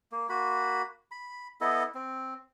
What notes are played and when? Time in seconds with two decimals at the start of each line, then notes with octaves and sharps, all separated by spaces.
0.12 A#3
0.29 A#3 F#4 B5
1.11 B5
1.61 B3 E4 A4 D#5
1.95 C4